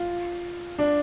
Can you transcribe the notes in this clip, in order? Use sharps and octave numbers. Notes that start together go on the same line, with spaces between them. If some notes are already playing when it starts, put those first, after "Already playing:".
Already playing: F4
D4